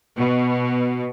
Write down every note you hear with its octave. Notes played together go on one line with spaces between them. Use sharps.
B2